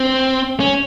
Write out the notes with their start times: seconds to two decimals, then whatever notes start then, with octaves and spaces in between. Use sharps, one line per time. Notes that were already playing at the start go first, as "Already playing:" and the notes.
Already playing: C4
0.60 C#4